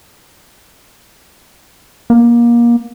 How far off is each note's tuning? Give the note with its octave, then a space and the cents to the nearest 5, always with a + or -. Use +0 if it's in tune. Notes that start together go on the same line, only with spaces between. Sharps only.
A#3 +25